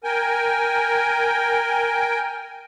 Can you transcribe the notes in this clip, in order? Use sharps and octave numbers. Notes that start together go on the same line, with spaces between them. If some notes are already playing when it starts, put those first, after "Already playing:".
A#4 G5 G#5